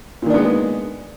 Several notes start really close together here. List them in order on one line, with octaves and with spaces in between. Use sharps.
A#2 D#3 D4 B3 G#3